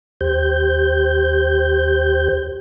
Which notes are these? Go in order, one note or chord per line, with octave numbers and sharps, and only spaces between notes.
D#2 G4 C5 G6